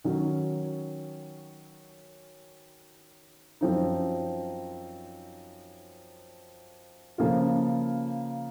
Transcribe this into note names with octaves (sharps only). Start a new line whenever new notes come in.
D#3 F#3 C#4
F#2 F3 C4 D#4
C#3 F3 A#3 F4